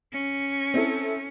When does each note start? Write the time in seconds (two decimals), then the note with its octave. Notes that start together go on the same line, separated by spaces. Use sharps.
0.13 C#4
0.74 C4 E4 A4